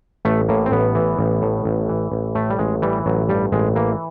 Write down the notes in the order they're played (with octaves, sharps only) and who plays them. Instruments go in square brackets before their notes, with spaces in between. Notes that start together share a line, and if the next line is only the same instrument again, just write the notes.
[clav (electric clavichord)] A1 A3
A2 A#3
C4
A1 B3
E3
A1
A2
A1
E3
A1
A2 A3
G3
A1 G#3
E3 G3
A1 F#3
G2 G3
A1 G#3
E3 A#3